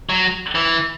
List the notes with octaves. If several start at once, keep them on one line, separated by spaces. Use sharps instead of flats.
F#3
E3